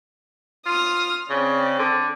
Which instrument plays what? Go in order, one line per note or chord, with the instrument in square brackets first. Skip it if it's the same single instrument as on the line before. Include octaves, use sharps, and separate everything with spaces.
[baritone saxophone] F4 [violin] D#6 F6
[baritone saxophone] C#3 [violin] C4 D5
[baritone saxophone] D3